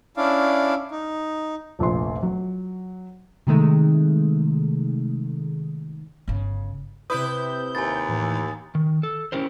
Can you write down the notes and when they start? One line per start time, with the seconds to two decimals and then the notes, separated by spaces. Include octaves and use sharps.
0.17 C#4 D4 E4 D5 F5
0.91 D#4
1.79 F1 A#1 F3 C6
2.23 F#3
3.47 C3 D#3 G#3 A3
6.28 G1 C#3
7.10 C3 E4 B4 D#6 G6
7.75 D#2 G#5 A6
8.08 A2 E3
8.75 D#3
9.03 A4
9.32 C#4 E4 G4 A#4 C5